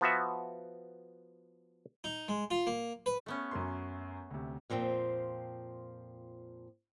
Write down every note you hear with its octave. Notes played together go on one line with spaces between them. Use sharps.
F3 B3 F#4 E5
D#4
G#3
F4
A#3
B4
A3 B3 C#4
F#2 A#4 C6
D2 C3
F2 A#2 F3 C4